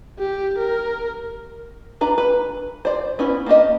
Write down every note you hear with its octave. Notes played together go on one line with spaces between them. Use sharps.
G4
A#4
D4 B4 A#5
B4
C5 D5
B3 C#4 E4
A#3 D4 G4 D#5